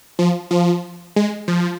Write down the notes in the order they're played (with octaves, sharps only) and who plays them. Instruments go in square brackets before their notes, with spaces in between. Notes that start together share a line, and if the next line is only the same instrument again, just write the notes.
[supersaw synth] F3
F3
G#3
F3